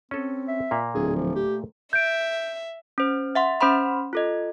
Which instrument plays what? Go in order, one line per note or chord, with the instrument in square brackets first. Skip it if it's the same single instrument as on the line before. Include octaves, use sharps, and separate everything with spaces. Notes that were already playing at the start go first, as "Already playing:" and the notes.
[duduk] C4 [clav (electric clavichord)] C#4 A4
[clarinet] E5
[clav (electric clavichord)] A#2 A#3
[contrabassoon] D1 [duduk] A3 [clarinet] G#4
[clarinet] F3
G4
[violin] E5 [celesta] G6 D7
[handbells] C#4 C5
E5 F#5 C6
C#4 C5 F#5 B5 C6
F4 A4 D#5